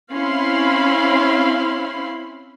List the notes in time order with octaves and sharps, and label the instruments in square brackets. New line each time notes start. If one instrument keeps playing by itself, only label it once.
[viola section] C4 C#4 E4 F5 B5 C6